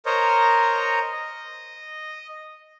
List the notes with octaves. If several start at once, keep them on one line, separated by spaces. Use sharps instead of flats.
A#4 C5 C#5 D#5 A#5
D#5